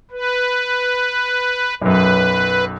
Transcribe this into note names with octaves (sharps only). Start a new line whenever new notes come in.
B4
B1 F#2 B4